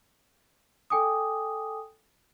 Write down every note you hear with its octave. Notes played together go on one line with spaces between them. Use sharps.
A4 G5 G#5 D6 D#6